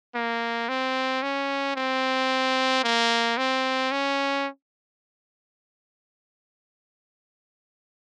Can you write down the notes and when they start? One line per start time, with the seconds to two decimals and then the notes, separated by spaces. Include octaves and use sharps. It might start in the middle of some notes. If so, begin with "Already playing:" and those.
0.15 A#3
0.69 C4
1.23 C#4
1.76 C4
2.84 A#3
3.38 C4
3.92 C#4